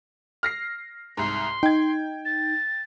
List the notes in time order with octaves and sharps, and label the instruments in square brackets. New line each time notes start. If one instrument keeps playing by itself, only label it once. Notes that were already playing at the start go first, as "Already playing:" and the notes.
[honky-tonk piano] F6 A#6 C7
[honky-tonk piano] C2 G#2 [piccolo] C6
[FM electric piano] D#4 [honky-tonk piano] G5 G#6
[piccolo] A6